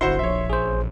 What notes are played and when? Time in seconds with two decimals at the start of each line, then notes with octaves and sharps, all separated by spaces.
0.01 D1 G1 E4 F#4 C5 C6
0.19 A#1 C#5 E5
0.50 A1 G#4 C5